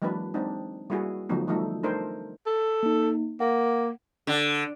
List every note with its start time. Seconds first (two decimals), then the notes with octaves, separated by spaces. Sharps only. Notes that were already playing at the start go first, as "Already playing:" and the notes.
0.02 E3 F#3 G#3 A#3 D4 B4
0.34 G#3 C4 D4 D#4
0.90 G3 A#3 E4 F#4 G#4
1.29 D3 F3 F#3 A3 B3 D#4
1.47 E3 F3 G3 A3 D#4 A4
1.83 A3 D4 D#4 A4 A#4 C5
2.46 A4
2.83 A#3 D#4
3.40 A#3 F#5
4.27 D3